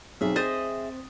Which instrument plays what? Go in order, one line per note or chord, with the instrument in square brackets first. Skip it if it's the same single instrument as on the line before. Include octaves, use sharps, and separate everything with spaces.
[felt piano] B1 [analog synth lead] C4 [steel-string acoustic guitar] G#4 E5
[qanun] C5 D#5 [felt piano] A6